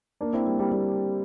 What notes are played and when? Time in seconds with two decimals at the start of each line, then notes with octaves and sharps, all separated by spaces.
0.21 A#3 D4
0.33 C4 E4
0.46 G3 A#3
0.59 G3 A#3
0.71 G3 A#3